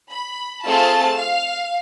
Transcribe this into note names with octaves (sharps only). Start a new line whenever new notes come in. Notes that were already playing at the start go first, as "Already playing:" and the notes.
B5
A3 C4 F4 G#4 A5
F5